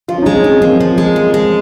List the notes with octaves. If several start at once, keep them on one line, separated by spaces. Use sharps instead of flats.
F3 F4
C#4
D#4
G#3
C#4
F3 C4
F3 A#3
F3
G#3
F3
G#3